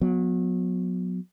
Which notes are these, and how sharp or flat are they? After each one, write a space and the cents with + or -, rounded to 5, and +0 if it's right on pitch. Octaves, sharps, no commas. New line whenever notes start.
F#3 -30 B3 +0